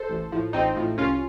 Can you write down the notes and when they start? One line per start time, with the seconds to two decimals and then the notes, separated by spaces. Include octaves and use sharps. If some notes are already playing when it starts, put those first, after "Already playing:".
Already playing: A4 C5
0.10 A1
0.32 A2 F3
0.53 A1 C4 D#4
0.76 A2 F3
0.98 C2 C#4 F4